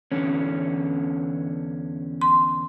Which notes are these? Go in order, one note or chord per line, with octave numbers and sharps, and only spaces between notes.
E2 D3 C#4
C6